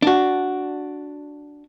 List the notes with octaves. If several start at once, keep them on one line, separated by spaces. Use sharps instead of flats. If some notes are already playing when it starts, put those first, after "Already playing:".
D4 F#4